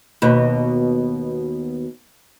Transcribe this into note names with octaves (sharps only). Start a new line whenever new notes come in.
D#2 B2